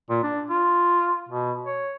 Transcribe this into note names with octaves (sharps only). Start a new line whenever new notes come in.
A#2
D4
F4
B2
C#5